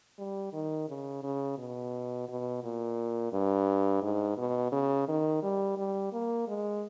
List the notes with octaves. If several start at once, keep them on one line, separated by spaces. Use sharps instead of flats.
G3
D#3
C#3
C#3
B2
B2
A#2
G2
G#2
B2
C#3
D#3
G3
G3
A#3
G#3